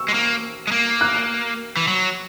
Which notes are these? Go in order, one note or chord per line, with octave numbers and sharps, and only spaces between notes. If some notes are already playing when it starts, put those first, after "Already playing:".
Already playing: C#6 E6
G#3
A#3
G#3
A#3
F#6
E3
F#3